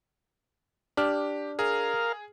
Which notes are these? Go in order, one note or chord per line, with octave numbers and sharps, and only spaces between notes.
D4 G4 F6
G#4 A#4 F5